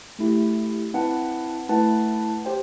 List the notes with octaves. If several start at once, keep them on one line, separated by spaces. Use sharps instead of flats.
A3 E4 G4
C4 E4 B4 F#5 A5
A3 E4 B4 F#5 A5
G4 C5 G5